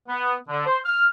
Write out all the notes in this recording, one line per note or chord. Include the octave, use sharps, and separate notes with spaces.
B3
D3
C5
F6